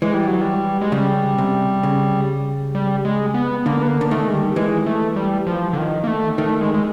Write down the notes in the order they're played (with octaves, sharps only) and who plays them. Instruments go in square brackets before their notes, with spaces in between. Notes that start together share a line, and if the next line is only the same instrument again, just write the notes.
[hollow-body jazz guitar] E3 [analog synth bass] G#3
[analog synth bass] G3
F#3
G3
G#3
[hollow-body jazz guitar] C#3 [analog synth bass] G3
[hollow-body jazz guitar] C3
C#3
[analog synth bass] G3
G#3
B3
[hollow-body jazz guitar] D3 [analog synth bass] A#3
[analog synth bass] B3
A#3
[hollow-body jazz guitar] D3
[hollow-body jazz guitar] D#3 [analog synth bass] A3
[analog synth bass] G#3
G3
[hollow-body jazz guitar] E3 [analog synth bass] G#3
[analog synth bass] A3
G3
F3
D3
D#3
A#3
A3
[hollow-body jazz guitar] D#3 [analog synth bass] A3
[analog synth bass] G#3
G#3